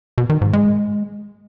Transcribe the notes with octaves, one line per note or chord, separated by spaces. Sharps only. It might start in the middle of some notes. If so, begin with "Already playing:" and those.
B2
D#3
G#2
G#3